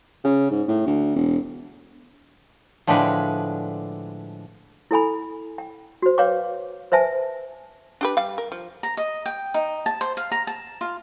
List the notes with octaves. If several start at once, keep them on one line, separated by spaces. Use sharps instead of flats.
C#3
G#2
A2
D2
E1
A2 D3 F3 G#3 D4 B4
E4 A4 G#5 B5
G5
F#4 C5
B4 C#5 F5 G5 D6
B4 C5 E5 G#5 A5
D4 G4 B4
G3 F5
A#4
F3
A#5
D#5
G5
D#4
A5
C5
F5
A#5
A5
F4